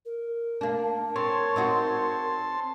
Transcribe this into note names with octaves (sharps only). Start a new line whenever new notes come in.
A#4
A#3 D4
C4 C#5 A5 C6
C4 D#4 F#4